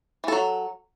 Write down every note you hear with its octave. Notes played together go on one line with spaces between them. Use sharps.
E3 F#3 A4